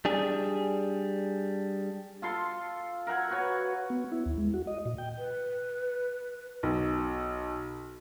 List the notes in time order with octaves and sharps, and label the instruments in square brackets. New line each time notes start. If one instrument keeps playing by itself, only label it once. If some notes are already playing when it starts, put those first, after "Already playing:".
[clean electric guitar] G3 D4 G#4
[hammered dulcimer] F4 A4 C6
A#4 E5 F#5 G#5
F#4 B4 C#5
[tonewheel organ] B3
E4
D#2
G#3
F#4
D#5
A#2
G5
[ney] B4
[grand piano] B1